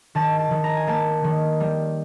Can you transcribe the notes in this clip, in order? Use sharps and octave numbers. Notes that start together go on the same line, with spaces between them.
D#3 A5
A5
D#3
A#5
G#5
A#3 A5
D#3
G3